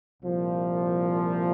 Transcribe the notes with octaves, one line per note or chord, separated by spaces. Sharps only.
C2 A#2 F3